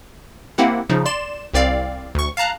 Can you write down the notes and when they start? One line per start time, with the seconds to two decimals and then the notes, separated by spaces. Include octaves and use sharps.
0.58 A#3 C4 E4 G4 F#5
0.89 C#3 F3 D#4
1.06 D5 C6 E7
1.54 C2 C4 D5 F5
2.15 D2 C#6
2.37 F5 A5 A#5 F#6